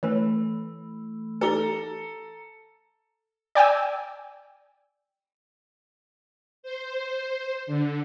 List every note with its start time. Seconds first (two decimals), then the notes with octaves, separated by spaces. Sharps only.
0.03 E3 A3 C#4 B4 C#5
1.41 D#4 G4 A4 D5 A#5 G7
3.55 D5 G5 G#5 E6
6.63 C5
7.67 D3